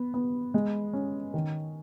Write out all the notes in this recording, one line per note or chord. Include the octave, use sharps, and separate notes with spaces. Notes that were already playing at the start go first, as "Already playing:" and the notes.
Already playing: B3
B3
G#3
C#4
D#3